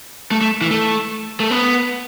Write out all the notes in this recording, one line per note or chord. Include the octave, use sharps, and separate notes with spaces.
A3
A3
E3
A3
A3
B3